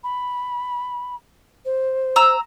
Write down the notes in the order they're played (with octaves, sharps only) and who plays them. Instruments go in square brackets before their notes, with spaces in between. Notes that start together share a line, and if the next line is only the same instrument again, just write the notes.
[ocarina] B5
C5
[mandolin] A#5 E6